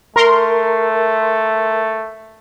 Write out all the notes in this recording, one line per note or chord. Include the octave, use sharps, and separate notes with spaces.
A3 A#4 C6